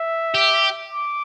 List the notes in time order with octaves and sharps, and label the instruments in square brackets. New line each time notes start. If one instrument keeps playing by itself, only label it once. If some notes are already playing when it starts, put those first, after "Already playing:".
Already playing: [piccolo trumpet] E5
[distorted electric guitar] G4
[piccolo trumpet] D6